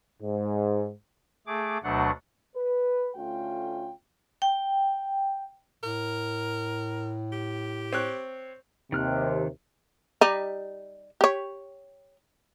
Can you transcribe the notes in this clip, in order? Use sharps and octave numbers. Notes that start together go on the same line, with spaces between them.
G#2
A3 G#4 D6
D2 B2 F#3 A3 D4 F#5
B4
D2 A3 C#4 F4 G5
G5
A2 A#4
G4
C4 C#5 F#6
D#2 C3 D#3 F6 F#6
G3 D#4
G4 C#5